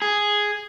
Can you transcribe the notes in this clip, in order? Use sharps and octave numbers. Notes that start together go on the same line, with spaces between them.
G#4